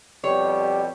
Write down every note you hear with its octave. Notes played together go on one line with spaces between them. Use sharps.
F2 B2 G3 G4 C#5